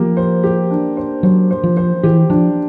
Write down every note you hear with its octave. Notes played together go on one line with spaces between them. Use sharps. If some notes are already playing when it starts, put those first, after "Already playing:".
Already playing: F3 A#3 G4
C5
G4
D4
C5
F#3 C5
C5
F3
C5
E3 G4
F3 D4